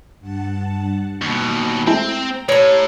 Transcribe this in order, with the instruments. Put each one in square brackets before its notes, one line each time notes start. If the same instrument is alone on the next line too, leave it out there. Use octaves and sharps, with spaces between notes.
[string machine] G2 F#5 A5
[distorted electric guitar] D#2 B2 [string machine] G5 A#5
[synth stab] G#3 A3 E4 [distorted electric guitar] C4
[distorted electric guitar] A2 [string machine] G4 [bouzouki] C#5 A#5